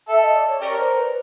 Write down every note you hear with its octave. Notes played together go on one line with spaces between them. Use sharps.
A4 E5
D#5
D5
C#5
C#4 G4 A#4 D5
C5
B4